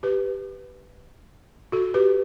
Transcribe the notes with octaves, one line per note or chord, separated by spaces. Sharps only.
G4 B4
F#4 A4
G4 B4